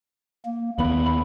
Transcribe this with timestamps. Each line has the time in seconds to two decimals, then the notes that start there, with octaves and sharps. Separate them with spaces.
0.45 A#3
0.78 D#2 B3 B5